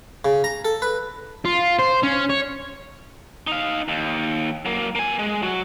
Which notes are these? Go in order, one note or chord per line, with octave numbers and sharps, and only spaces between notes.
C#3
A#5
A4
B4
F4
C5
C#4
C#5
D#4 F5
D#2
F#3 A#3
A#3 G#5
G#3
F#3 F#4